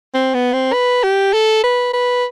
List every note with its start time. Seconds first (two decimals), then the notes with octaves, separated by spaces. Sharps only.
0.14 C4
0.34 B3
0.53 C4
0.73 B4
1.03 G4
1.33 A4
1.64 B4
1.93 B4